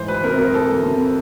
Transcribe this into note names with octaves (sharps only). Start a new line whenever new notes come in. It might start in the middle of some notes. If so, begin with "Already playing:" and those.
Already playing: G#2 E3 C5
D2 B4
C3 A#4
D2 A#4
E3 A4
D2
C3